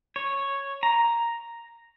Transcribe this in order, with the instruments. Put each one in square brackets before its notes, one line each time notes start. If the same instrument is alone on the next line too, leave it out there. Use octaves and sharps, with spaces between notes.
[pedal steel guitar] C#5
A#5